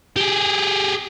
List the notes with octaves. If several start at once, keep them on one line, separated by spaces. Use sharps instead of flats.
G4 G#4